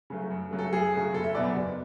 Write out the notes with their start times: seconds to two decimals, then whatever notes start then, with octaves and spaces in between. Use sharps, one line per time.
0.10 C#3 F#3 A3
0.30 F#2
0.51 C#3 F#3 A3
0.59 A4
0.72 F#2 G#4
0.93 C#3 F#3 A3
1.14 F#1 A4
1.24 E5
1.35 E2 B2 F#3 B3 D5
1.56 F#1